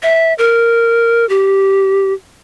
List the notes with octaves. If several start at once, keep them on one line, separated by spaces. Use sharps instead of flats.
E5
A#4
G4